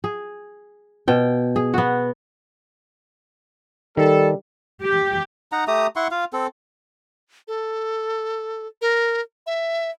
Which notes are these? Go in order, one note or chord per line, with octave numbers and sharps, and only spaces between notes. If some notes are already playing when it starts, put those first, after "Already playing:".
G#4
B2 G5
G#4
B3 F#4
D#3 G3 A4
G4
D#4 F#5 A#5
A3 G4 A#5 D#6
E4 F#5 C6 C#6
F4 F5
C4 A4
A4
A#4
E5